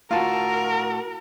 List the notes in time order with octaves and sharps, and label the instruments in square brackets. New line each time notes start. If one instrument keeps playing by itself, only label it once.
[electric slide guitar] A2 F#4 [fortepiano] F4 A5 [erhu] A#4